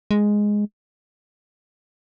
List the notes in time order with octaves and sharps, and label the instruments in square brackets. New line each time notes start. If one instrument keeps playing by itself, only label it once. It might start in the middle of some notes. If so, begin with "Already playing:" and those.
[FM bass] G#3